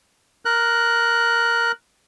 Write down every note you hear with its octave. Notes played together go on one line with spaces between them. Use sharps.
A#4 F#6